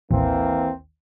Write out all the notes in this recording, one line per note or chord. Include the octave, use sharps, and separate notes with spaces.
A1 D#2 E3 A#3 C4